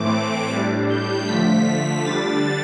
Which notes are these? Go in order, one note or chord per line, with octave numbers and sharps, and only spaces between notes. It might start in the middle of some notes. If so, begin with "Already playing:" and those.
Already playing: A2 E3 A3 C4 D6
A2 G3 D4
G6
D3 F3 A3 B6
B6
D3 G3 D4 A6